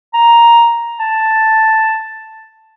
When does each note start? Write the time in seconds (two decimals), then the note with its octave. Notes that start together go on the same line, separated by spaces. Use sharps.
0.13 A#5
0.99 A5